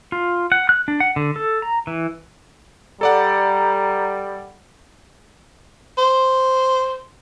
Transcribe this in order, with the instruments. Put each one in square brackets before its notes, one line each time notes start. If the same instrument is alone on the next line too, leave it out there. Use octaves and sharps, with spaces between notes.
[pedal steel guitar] F4
F#5
F#6
D4
F#5
D3
A4
A#5
E3
[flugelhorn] G3 [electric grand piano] A4 D5 F#5 [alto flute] A#5
[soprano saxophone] C5